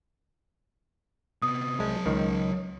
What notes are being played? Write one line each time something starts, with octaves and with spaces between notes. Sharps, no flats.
C3 B3 D#6
C2 F#3 G#3 A5
C#2 D#3